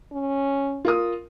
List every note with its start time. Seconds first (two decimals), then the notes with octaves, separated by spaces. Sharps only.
0.12 C#4
0.85 F4 A#4 D#6